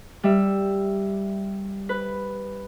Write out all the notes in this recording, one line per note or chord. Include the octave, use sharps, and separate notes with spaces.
G3 E5
B4